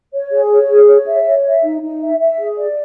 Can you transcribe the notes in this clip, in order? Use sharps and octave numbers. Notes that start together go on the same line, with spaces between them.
C#5
G#4
C#5
G#4
C#5
E5
C#5
E5
D#4
D#4
E5
E5
G#4
D5